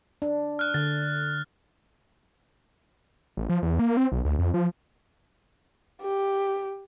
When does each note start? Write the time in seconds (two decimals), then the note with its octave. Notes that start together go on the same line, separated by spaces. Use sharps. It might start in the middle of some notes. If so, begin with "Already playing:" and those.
0.22 D4
0.59 F6 F#6
0.74 D3 A6
3.37 A1
3.49 F3
3.63 E2
3.79 A#3
3.97 C4
4.12 B1
4.25 D2
4.39 F2
4.54 F3
6.02 G4